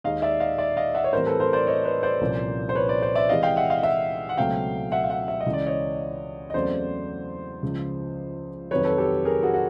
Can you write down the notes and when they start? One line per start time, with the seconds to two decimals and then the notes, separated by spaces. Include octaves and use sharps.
0.04 D#2 D#3 G#3 D#5 F5
0.22 D5 E5
0.40 D#5 F5
0.58 D5 E5
0.77 D#5 F5
0.94 E5 F#5
1.04 C#5
1.12 A2 E3 G3 C4 A#4 C5
1.26 A4 B4
1.40 A#4 C5
1.53 C5 D5
1.67 C#5 D#5
1.84 B4 C#5
2.03 C5 D5
2.21 C2 A#2 F3 A#3 C#4
2.69 C5
2.75 B4 C#5
2.89 C5 D5
3.02 C5 D5
3.15 D5 E5
3.29 C3 E3 G#3 D#5 F5
3.43 F5 G5
3.56 E5 F#5
3.70 D#5 F5
3.83 E5 F#5
4.29 F#5
4.37 C#2 B2 F#3 A3 C4 F5 G5
4.92 E5 F#5
5.04 F5
5.10 E5 F#5
5.28 E5
5.40 D#5
5.46 C#2 C#3 E3
5.53 D5
5.66 C#5 D#5
6.50 D#5
6.54 E2 C#3 F#3 A3 C4 C5 D5
7.63 C#2 C#3 F3
8.71 F2 C3 D#3 F#3 B4 C#5
8.84 A4 B4
8.98 G4 A4
9.25 G#4 A#4
9.43 F#4 G#4
9.54 F#4